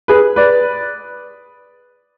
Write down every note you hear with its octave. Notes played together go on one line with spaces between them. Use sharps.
G#4 B4
B4 D5